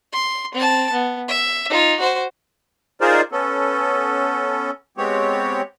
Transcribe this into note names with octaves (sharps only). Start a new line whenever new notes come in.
C6
C4 A5
B3
E5
D#4 F4
F#4 C5
D#4 F4 G#4 A#4 C5 D5
B3 C#4 A4
G#3 B3 C4 G4 C#5